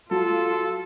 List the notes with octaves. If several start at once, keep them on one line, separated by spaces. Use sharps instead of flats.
F#3 F4 A4